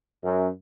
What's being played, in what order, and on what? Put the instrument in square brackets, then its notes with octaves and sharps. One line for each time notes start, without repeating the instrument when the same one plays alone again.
[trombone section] F#2